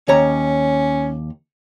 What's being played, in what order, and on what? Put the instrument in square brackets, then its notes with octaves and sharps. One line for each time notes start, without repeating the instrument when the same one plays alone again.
[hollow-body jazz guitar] D#2 C#5 A#5 [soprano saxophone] C#4